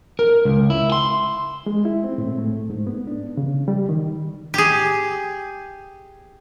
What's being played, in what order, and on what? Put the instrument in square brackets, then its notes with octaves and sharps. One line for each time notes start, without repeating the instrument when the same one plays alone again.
[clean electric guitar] A#4
C#2
E4
C6
[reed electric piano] G#3
E4
C4
A2
A3
G#2
B3
D4
C#3
G3
D#3
[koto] G4 G#4